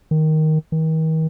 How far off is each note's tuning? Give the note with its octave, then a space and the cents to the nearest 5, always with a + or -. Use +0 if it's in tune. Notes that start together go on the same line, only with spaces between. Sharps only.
D#3 +5
D#3 +40